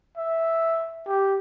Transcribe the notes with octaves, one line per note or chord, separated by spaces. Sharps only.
E5
G4